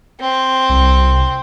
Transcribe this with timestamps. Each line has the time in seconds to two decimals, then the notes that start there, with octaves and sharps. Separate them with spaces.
0.20 C4
0.69 C2